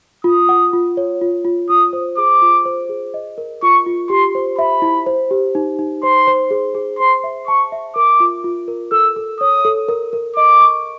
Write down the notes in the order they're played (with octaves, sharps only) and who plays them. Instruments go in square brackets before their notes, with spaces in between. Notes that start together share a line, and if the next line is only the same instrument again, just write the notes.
[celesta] F4 [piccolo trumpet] D#6
[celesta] F#5
F4
C#5
F4
F4
[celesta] F4 [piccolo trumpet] D#6
[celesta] C5
[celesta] G#4 [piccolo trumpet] D6
[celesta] F4
C5
G#4
D#5
A#4
[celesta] F4 [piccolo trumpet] C#6
[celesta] F4
[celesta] G4 [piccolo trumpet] C6
[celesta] C5
[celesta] E5 [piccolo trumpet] B5
[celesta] E4
C5
G4
D#4
D#4
[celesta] C5 [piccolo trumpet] C6
[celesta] C5
G#4
G#4
[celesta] C5 [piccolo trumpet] C6
[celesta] E5
[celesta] A5 [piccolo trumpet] C#6
[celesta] E5
[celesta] A#4 [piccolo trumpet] D6
[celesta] F4
F4
A#4
[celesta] A4 [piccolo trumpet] E6
[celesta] A4
[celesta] C#5 [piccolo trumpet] D#6
[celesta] A4
A#4
A#4
[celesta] D#5 [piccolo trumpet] D6
[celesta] C#6